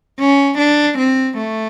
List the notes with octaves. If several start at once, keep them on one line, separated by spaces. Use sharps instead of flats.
C#4
D4
C4
A3